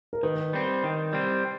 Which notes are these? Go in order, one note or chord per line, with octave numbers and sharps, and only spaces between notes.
A#4
D#3 B4
G3 C4
D#3
G3 C4